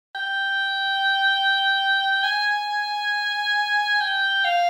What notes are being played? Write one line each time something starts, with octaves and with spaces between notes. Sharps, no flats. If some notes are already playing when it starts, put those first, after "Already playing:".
G5
G#5
G5
F5